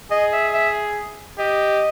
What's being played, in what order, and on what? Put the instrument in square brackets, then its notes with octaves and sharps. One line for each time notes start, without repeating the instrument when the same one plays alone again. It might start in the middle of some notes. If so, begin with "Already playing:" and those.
[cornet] G#4 [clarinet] D#5
[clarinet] E5
E5
[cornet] G4 [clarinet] D#5